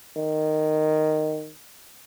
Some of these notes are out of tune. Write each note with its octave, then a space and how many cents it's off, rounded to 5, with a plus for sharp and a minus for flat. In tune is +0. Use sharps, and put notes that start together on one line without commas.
D#3 -10